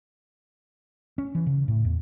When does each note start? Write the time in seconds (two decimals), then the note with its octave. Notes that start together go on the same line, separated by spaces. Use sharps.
1.18 C#4
1.35 E3
1.47 C#3
1.68 A2
1.85 E2